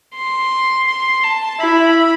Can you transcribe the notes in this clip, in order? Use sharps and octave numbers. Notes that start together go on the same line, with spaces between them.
C6
C6
A5
E4 B5